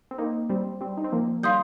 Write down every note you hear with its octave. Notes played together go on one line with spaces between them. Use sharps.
C4
A#3 D#4
G3 C4
G3 C4
D#4
C4
F3 A#3
D#3 G3 F5 C6 D#6 G6